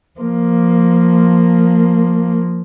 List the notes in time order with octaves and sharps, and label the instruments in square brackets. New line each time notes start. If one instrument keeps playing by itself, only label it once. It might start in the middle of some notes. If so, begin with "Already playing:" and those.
[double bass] F3 A#3